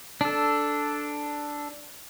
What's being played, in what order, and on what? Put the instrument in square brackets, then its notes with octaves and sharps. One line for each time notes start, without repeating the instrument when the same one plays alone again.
[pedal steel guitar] D4 A4